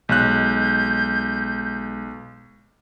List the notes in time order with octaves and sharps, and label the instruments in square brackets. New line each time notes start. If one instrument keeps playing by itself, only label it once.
[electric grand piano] B1 F#6 [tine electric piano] G#3 [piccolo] G6